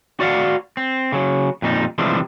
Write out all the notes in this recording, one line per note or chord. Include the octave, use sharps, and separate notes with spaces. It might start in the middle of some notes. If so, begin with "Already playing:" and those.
F#4 D5 D#5 F5 F#5
C4
C#3 F#3
F2 A#2 G3 D#4
C3 E3 F3 G3 G#3 D4